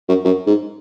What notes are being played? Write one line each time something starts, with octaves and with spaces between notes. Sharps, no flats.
F#2
F#2
G#2